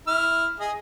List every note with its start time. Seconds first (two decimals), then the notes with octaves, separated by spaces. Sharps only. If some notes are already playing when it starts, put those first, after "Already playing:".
0.07 E4 F6
0.60 G#4 D#5